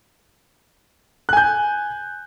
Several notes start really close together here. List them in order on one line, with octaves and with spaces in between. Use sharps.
F#6 G#5 G6